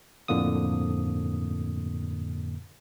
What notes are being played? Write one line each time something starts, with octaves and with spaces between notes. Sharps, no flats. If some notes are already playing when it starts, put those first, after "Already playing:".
F2 A2 D3 A#3 D#6